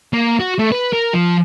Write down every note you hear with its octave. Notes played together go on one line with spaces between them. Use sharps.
A#3
F#4
A3
B4
A#4
F3